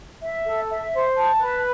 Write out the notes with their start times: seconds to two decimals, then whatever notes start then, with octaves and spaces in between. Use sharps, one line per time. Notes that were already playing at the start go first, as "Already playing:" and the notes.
0.22 E5
0.44 A4
0.69 E5
0.93 C5
1.16 A5
1.39 B4